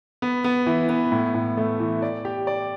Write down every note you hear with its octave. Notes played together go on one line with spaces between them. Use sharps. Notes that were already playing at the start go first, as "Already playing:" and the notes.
B3
B3
E3
B3
A2
A2
A3
E3
D5
G4
D5